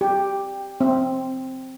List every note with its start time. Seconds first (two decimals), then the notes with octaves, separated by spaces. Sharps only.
0.01 G4
0.81 C4